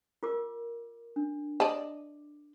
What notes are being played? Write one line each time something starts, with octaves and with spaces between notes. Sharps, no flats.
F4 A#4 D6
D4
D5 D#5 A5 D6